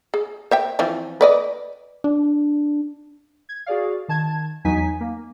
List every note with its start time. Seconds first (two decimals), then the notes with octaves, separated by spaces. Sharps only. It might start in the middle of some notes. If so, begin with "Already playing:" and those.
0.14 G#4
0.51 C5 E5 G5
0.79 E3 F3 C4
1.21 B4 D5 D#5
2.04 D4
3.49 G#6
3.66 F#4 G#4 D5 F5
4.08 D#3 A5 G#6
4.65 E2 F#3 B3 D#4 G#5 B6
5.01 A#3